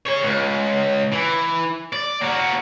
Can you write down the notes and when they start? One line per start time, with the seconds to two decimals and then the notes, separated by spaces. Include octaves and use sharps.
0.07 G#4 C#5
0.24 C#2
1.12 E3
1.93 D5
2.21 A#3 F#4